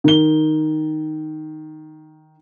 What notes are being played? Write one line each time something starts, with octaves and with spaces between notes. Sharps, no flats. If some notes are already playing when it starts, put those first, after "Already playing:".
D#3 G7